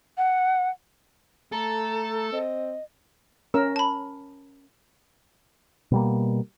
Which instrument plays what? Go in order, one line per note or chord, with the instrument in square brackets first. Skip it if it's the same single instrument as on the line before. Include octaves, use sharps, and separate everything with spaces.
[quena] F#5
[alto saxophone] A3 [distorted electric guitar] A4 [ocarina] A#5
[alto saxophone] C4 [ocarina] D#5
[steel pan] C#4 A#4 E6
[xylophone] A5 B5
[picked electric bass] B2 G3 A#3